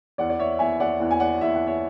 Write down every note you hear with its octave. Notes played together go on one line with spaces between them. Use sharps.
E2 D5 F#5
D5
C#5 E5
E2 E5 G#5
D5 F#5
E2 F#5
G#5
D5 F#5
E2 E5
F#5
C#5 E5